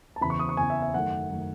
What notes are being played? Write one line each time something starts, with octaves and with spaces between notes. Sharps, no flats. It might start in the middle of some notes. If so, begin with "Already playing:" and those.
A5
E2 C#3 E3 B5
C#6
D#6
C#6
E2 C#3 E3 G#5
E5
E5
F#2 D#3 A3 F#5
F#2 D#3 A3